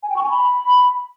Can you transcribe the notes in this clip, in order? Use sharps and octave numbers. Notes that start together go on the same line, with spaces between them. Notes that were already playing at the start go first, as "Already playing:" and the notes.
G#5
G5
C#6
G#5
B5